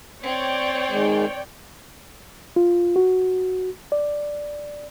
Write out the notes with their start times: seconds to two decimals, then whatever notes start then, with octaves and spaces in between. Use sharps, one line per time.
0.23 C4 C#5 D5 G5
0.90 D#3 G#3
2.56 F4
2.96 F#4
3.92 D5